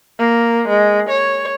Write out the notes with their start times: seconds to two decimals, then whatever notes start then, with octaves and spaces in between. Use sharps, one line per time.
0.19 A#3
0.68 G#3
1.10 C#5